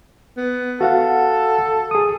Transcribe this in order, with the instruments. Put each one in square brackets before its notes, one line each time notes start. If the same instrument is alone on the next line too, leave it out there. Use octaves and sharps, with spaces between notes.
[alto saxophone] B3
[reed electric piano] F#4 F5 F#5 [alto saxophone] A4
[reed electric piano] G#4 D#6